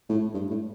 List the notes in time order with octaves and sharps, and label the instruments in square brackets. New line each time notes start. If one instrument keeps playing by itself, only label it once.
[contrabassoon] A2
G2
A2